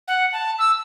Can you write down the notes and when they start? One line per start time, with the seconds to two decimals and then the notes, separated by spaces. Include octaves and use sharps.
0.08 F#5
0.33 A5
0.59 E6